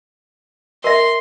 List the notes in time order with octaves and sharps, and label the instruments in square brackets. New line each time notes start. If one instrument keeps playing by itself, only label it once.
[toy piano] A#4 E5 [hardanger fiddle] C6